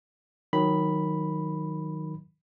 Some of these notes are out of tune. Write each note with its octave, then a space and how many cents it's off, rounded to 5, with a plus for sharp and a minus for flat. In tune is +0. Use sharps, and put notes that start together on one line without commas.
D#3 +0 F#3 -15 B5 +0